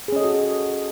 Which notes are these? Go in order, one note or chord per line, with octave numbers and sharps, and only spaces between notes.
C#4 F#4 G#4 A4 D#5